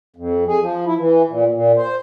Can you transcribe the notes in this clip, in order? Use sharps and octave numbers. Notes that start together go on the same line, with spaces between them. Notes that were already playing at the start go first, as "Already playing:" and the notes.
F2
G#4
F3
E4
E3
A#2
A#2
C5